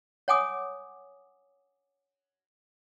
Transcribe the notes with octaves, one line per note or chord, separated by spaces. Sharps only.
C#5 F#5 G#5 D6 D#6